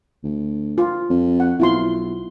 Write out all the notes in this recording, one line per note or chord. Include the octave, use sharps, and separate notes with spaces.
D2
F4
F2
F#5
B1 E4 F4 C6